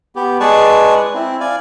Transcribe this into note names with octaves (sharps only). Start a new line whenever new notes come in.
B3 G4
G#3 G#4 B4 D5 A5 C#6
C4 E4
D5 F5 G#5